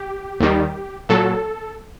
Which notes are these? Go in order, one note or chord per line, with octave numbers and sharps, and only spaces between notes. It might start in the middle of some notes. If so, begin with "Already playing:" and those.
Already playing: G4
D#2 D#3 G3
A#2 F#3 A4